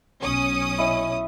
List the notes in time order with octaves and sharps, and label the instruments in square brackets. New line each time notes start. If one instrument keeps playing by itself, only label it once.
[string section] B1 C#4 D#6
[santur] E4 D#5